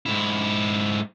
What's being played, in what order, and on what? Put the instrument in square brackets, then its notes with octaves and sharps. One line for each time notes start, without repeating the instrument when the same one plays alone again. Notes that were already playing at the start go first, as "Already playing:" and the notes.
[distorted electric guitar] G#2 E4